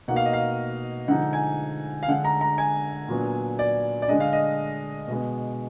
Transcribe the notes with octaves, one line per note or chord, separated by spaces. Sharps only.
B2 A#3 D#4 F#5
F5
D#5
F5
D3 F3 G#3 D#4 F#5
G#5
F5
D3 G#3 D4 F#5
A#5
A#5
G#5
A#2 F#3 B3 D4
D5
D5
D3 G#3 D4 D#5
F5
D#5
B2 G#3 B3